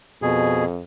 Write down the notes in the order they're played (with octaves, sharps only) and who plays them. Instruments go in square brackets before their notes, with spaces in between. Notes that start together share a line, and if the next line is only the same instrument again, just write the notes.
[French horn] F2 [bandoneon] B2 G#4